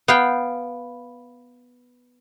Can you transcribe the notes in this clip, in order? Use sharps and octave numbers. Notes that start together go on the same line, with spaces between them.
B3 F5 G5